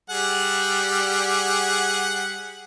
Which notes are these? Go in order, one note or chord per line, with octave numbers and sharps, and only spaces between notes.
G3 G#4 F#5